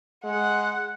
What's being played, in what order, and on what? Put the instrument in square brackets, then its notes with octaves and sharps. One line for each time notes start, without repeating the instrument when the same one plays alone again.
[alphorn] G#3 [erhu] F#5